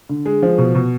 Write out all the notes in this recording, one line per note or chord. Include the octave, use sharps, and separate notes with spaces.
D3
G#3
F3
B2
B2